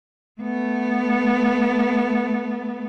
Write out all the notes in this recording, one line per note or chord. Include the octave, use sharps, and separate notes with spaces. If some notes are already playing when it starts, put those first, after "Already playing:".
A3 B3